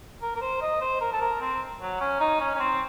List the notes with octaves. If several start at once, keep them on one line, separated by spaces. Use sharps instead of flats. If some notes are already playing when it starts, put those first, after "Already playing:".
A#4
A#4
C5
D#5
C5
A#4
A4
A#4
C4
F#3
C#4
D#4
C#4
C#4
C4